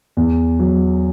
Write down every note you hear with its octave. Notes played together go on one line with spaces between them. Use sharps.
E2
F#3